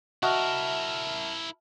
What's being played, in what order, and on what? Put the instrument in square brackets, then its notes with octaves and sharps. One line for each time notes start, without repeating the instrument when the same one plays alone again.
[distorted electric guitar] E4 A#4 [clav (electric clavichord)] F#4 D#5 [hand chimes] E5 A5 F6